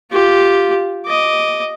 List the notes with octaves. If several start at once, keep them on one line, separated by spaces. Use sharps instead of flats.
F4 G4
D#5 D6